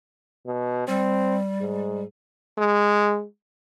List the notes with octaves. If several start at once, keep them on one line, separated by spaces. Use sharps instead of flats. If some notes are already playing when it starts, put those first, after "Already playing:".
B2
G3 C4
G#2
G#3